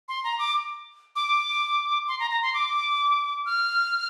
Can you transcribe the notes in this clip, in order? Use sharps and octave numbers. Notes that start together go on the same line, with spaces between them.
C6
A#5
D6
D6
C6
A#5
A#5
C6
D6
F6